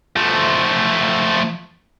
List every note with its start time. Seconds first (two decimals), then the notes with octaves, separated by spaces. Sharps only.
0.16 F3 A3